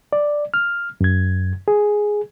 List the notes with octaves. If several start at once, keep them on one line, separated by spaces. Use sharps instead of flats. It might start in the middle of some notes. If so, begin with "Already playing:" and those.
D5
F6
F#2 G#6
G#4